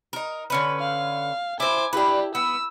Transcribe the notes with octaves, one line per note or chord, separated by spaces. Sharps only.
D#4 A#4
D3 C#4 B4
F5
E4 C5 G#5 D6
D4 E4 G4 B4
B3 E6